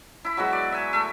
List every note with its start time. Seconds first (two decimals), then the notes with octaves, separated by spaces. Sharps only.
0.25 E4 B5
0.37 F#3 G#3 B3 F#4
0.53 D5
0.72 E5 G#5
0.93 A3 E5